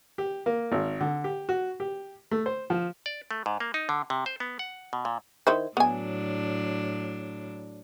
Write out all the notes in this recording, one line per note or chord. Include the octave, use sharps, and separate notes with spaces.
G4
A#3
G#1
D3
G4
F#4
G4
A3
C5
F3
D5
A3
G#2
A#3
D#4
D3
C3
C5
B3
F#5
B2
A#2
D#3 E4 C5
A2 F#3 B3 D4 G#5